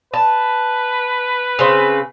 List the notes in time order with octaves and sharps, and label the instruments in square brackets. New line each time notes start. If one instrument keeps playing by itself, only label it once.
[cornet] B4 [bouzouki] A5
[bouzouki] C#3 C4